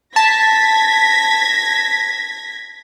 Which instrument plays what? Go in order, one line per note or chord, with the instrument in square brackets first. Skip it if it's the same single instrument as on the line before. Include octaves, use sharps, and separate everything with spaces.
[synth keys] A5 [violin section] G#6 A#6 B6